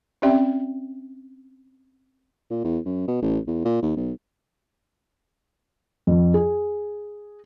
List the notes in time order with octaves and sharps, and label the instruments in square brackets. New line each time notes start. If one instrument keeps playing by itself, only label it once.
[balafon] C4 C#4 G4 D5 E5 G5
[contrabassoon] A#2
E2
F#2
B2
A1
E2
A#2
D#2
B1
[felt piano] F2
G#4